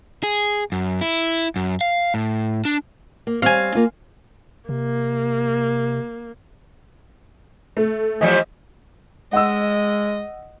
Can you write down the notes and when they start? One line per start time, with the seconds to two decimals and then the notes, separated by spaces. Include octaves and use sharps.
0.23 G#4
0.72 F#2
1.01 E4
1.56 F#2
1.81 F5
2.14 A2
2.65 D4
3.27 A#3
3.42 G3 C4 C#5 F5 G#5
3.75 A#3 F4
4.69 C3 A#3
7.77 A3
8.21 E3 F3 G3 D#5
9.33 G#3 D#5 F#5 E6